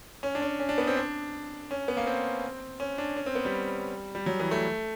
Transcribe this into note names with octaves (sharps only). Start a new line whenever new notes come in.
C#4
D4
C#4
C#4
D4
B3
C4
D4
C#4
B3
A#3
C4
C#4
D4
C#4
C4
B3
G3
G3
F#3
E3
A3